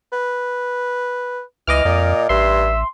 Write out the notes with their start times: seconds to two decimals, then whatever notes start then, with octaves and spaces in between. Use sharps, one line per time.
0.12 B4
1.67 C#2 E3 D#5 D6 F6
1.85 F2 A#2
2.29 A1 G2 E5 C6